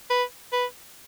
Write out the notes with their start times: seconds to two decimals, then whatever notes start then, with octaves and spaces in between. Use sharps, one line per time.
0.10 B4
0.53 B4